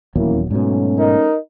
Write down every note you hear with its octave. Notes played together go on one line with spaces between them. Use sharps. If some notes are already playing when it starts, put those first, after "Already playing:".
D#1 E2 F#3 A#3 C#4 E4
G#2 B2 F#3 A3 C#4
D#4 A#4